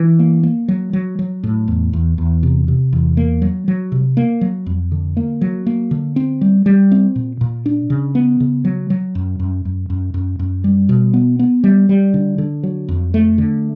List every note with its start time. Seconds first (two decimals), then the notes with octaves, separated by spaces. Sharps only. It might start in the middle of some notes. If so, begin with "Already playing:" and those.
Already playing: E3
0.19 A#3
0.43 A#3
0.68 F#3
0.93 F#3
1.19 F#3
1.43 A2
1.68 E2
1.93 E2
2.18 E2
2.43 C3
2.68 C3
2.93 E2
3.17 A#3
3.42 F#3
3.68 F#3
3.92 C3
4.17 A#3
4.41 F#3
4.66 F2
4.92 D3
5.17 A#3
5.41 F#3
5.66 A#3
5.91 D3
6.16 C4
6.41 G3
6.66 G3
6.92 C4
7.16 A#2
7.41 A#2
7.66 D4
7.90 C#3
8.15 B3
8.40 C#3
8.65 F#3
8.90 F#3
9.15 F#2
9.40 F#2
9.65 F#2
9.90 F#2
10.14 F#2
10.39 F#2
10.64 G3
10.89 B2
11.14 B3
11.39 B3
11.64 G3
11.89 G3
12.14 D3
12.38 D3
12.63 F#3
12.88 F2
13.14 A3
13.38 D3